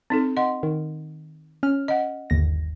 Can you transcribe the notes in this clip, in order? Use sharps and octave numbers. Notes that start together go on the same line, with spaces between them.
C4 D#4 A4
D#5 F#5 C6
D#3
C#4 F6
D#5 F#5
G1 D#2 A#6